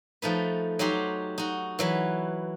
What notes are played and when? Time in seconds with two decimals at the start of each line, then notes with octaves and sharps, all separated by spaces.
0.22 F3 A3 D#4 B4
0.79 F#3 D#4 F#4 G4 C6
1.38 D#4 F#4
1.79 E3 F#3 B4